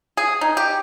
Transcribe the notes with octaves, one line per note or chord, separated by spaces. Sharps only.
G#4
D#4
G4